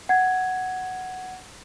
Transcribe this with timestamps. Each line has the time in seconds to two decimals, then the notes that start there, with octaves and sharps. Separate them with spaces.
0.09 F#5 G#6